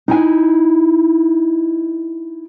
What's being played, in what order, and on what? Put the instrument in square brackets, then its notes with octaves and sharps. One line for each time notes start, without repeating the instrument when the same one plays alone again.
[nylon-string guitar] D#4 E4 G#5